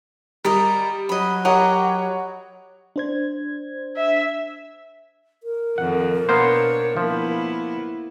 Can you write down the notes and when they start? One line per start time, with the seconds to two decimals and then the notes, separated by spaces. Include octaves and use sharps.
0.45 G3 A#4 D5 D#5
1.09 F#3 D#5 B5
1.45 G4 A#4 C#5 D#5 F#5 B5
2.96 D4 C5 G#6
3.96 E5
5.43 A#4
5.78 F2 D#3 F#5
6.29 B2 A#3 B3 D4 C5 C#5
6.97 F3 A#3 B3 E4